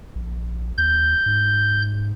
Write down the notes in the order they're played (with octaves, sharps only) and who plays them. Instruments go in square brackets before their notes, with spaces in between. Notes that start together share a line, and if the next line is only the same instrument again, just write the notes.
[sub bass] A#1
[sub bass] D#2 [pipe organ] G6
[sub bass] G#2